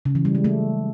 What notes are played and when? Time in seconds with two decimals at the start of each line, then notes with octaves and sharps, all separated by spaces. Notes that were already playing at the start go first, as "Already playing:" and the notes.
0.05 C#3
0.15 E3
0.25 G3
0.35 G#3
0.44 A3